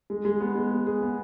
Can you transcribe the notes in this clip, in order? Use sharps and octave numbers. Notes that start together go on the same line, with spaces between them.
G#3
G#3
B3
G#3
B3
G#4
B3